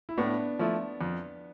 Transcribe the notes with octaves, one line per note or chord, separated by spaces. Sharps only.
E4
A2 B3 D4
F3 A3 E4
F2